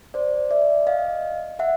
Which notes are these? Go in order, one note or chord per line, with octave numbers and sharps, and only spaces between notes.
C5 D5
D5 E5
D#5 F5
E5 F#5